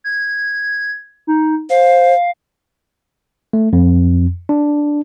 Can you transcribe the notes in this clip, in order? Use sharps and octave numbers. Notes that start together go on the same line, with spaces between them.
G#6
D#4
C5 F5
A3
F2
D4